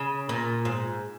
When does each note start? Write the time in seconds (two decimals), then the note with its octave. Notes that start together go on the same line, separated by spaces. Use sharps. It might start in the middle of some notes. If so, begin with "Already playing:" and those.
Already playing: C#3
0.29 A#2
0.65 G#2